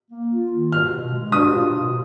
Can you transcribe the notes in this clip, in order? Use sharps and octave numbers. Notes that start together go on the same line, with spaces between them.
A#3
F4
D#3
F4 F6
B2
G#3
D4 D#6
F4
B2